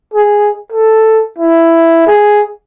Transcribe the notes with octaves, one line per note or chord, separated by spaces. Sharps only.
G#4
A4
E4
G#4